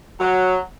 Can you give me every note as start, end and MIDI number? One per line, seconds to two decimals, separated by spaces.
0.19 0.57 54